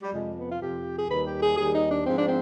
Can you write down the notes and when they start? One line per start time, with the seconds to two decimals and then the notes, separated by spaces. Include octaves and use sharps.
0.02 G3
0.10 F2 C3 F3 G#3
0.34 B3
0.48 F4
0.59 F2 C3 F3 G4
0.96 G#4
1.07 D#2 D#3 G3 B4
1.24 G4
1.40 G#4
1.55 D#2 D#3 G3 G#4
1.72 D#4
1.88 D4
2.03 G#2 F3 C4
2.15 D4
2.25 C4